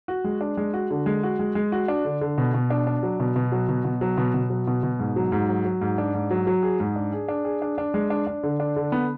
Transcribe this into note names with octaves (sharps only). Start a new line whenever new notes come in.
F#4
G#3
D4
G#3
F#4
D3
G#3
F#4
G#3
G#3
F#4
D4
D3
D3
B2
B2
D4
D4
F#3
B2
B2
F#3
B2
B2
F#3
B2
B2
F#3
B2
B2
G#2
F#3
G#2
F#3
F#3
G#2
D4
G#2
F#3
F#3
G#4
G#2
D4
G#4
D4
G#4
D4
D4
G#3
D4
D4
D3
D4
D3
B3